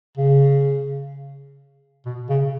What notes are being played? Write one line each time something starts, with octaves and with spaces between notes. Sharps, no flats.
C#3
B2
C#3